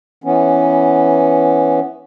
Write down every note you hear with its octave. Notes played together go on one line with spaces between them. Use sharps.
E3 B3 C#4